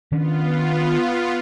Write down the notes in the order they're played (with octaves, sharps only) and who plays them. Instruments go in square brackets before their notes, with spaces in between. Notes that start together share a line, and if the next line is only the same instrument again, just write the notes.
[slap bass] D#3 C#4 D4 [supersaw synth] B3 F4